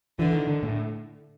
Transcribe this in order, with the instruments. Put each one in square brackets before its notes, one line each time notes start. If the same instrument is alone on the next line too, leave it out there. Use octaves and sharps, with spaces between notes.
[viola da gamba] D3 [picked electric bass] E3
[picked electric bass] D#3
D3
A2